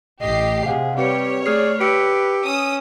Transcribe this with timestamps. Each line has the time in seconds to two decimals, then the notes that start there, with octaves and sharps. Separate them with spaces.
0.22 A1 G4 D#5 C7
0.66 C3 G#4 F5 F#5
0.98 G3 C4 G4 B4 C#5 C#7
1.46 A3 G#4 D5 F6 C7
1.81 G4 B4 E6 C#7 D7
2.45 C#4 D#6 E6